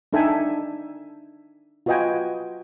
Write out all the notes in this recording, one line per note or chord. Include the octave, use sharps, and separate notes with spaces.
D4 D#4 A4 E5 G5 G#5
F4 F#4 B4 D#5 G5 G#5